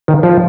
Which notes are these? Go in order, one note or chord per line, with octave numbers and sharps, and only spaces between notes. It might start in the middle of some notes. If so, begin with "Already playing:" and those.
D#3
F3